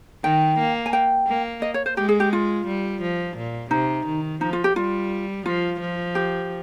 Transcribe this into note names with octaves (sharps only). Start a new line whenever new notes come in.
D#3 G5
A#3
G#5
G5
A#3
D#5
C#5
C5
G#3 G4
G#4
G4
F4
G3
F3
A#2
C3 D#4
D#3
F3 D#4
F4
G4
G3 F4
F3 F4
F3
G4